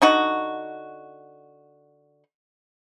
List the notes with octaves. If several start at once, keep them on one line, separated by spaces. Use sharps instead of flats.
D3 D#4 F#4